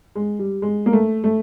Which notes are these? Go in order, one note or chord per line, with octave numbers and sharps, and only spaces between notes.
G#3
G3
G#3
A#3
A3
A3